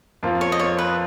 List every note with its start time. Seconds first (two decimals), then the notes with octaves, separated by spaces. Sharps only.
0.23 F2 F3 A#3 F4
0.41 C#5
0.52 D#5
0.59 C#5
0.78 B4